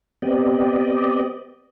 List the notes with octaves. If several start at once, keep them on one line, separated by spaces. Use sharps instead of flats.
B3 C4 G4 D5 D#5